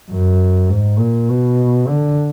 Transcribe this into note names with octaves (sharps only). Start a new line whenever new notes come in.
F#2
G#2
A#2
B2
D3